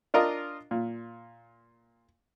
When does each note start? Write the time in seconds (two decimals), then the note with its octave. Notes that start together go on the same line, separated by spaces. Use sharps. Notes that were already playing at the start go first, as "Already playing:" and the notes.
0.14 D4 F4 A#4 D#5
0.71 A#2